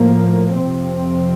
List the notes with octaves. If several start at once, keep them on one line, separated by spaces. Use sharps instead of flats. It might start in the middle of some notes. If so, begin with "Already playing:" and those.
Already playing: A2 F3 A#3
F2 C3 F3 C4